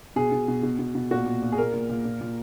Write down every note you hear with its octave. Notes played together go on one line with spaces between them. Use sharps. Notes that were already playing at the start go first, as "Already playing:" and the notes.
B2 G#4
B2
B2
B2
B2
B2
A#2 F#4
A#2
A#2
G#4
A#2 A#4
A#2
A#2
A#2
A#2